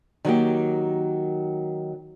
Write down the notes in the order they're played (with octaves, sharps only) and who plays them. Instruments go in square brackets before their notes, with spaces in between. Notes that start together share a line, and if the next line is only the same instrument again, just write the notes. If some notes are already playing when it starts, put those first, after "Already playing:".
[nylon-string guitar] D#3 F#3 A#3 G4